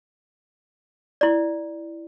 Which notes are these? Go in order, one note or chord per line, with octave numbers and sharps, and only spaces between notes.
E4 D5